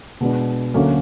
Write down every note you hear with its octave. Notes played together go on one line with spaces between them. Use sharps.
B2 G#3 B3 D4
D2 D3 F#3 A#3 C#4